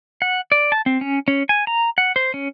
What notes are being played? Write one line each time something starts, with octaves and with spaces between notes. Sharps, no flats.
F#5
D5
A5
C4
C#4
C#4
G#5
A#5
F#5
C5
C#4